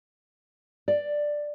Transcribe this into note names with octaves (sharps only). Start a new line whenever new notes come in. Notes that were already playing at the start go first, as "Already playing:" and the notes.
D5